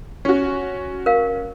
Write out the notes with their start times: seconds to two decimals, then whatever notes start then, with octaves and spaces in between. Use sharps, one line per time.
0.25 C#4 F#4
1.06 A#4 F5